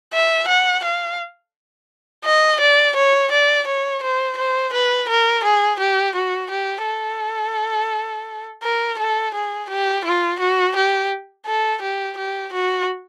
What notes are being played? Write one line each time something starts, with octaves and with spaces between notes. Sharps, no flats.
E5
F#5
F5
D#5
D5
C#5
D5
C#5
C5
C5
B4
A#4
G#4
G4
F#4
G4
A4
A#4
A4
G#4
G4
F4
F#4
G4
A4
G4
G4
F#4